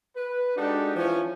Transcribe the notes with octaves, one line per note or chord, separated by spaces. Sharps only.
B4
G#3 D4 D#4 F#4 G4 A4
E3 F3 C#4